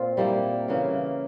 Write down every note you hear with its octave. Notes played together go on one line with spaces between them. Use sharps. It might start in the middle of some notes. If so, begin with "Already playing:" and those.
Already playing: A#2 C4 F4
G3 A#3 E4
C#3 E3 A#3